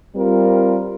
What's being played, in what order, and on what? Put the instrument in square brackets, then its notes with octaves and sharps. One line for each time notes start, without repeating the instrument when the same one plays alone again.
[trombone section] G3 C4 F4 A#4